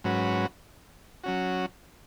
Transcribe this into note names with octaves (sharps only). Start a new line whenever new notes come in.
G#2 F#3 C#4 F#4 B4
F#3 C#4 F#4